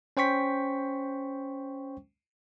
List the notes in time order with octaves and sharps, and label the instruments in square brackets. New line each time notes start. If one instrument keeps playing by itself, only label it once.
[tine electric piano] C#4 C5 G5 C#6 B6